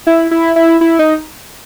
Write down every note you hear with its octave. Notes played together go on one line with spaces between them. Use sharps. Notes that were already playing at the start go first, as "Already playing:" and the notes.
E4
E4
E4
E4
D#4